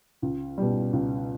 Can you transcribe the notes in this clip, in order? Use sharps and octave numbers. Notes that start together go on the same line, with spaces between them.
C#2
B2 G3
C#2